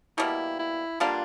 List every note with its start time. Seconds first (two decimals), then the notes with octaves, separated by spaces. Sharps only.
0.18 B2 G3 A#3 E4
0.59 E4
1.00 D3 G3 A#3 D4 F4